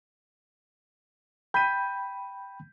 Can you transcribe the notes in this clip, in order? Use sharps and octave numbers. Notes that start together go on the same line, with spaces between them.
G5 B5 G6 B6 D#7